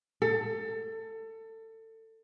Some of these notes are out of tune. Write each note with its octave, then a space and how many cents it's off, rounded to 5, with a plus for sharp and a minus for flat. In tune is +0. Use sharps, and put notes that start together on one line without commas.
A4 +25